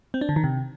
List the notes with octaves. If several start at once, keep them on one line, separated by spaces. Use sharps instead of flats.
C4
D4
D3
D#3
C3